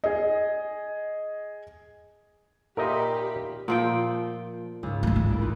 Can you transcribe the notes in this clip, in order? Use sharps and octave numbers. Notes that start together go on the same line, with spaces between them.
G#4 D#5
A#2 D#4 G4 A#4 D#5 E5 B5 C6
A#2 F3 G5
C#2 G#2
G#3 A#3 G#6
A1 A3
A#3 E4 D5
D#4 F4 B4